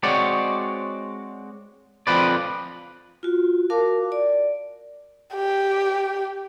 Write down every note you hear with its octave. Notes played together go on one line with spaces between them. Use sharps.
G#3 C4 F#4 C#5 D5
F2 F3 C4 B4 D5
F4 F#4
F#4 A#4 F5 A5 D6
D5
G4